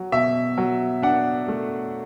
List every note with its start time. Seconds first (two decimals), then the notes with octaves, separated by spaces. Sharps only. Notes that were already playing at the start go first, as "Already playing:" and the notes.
Already playing: F#3
0.12 B2 E5
0.58 F#3
1.02 D4 F#5
1.48 A3